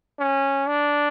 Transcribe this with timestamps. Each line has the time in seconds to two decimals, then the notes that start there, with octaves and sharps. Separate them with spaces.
0.19 C#4
0.68 D4